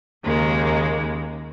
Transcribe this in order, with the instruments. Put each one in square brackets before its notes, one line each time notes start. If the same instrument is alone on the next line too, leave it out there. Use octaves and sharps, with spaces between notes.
[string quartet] D#2 C#3 G#3 A#3